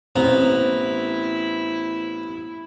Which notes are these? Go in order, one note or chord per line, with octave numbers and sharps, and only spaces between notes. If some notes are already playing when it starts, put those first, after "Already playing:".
A1 B3 C4 E4 A#5